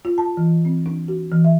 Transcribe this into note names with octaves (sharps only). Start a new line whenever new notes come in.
F4
A5
E3
C4
D4
F#4
E3
E5